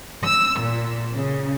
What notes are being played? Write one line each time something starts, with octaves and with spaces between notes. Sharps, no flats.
E6
A#2
C#3